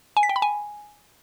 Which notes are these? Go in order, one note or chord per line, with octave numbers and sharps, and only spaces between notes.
G#5
B6
G5
B5
G#5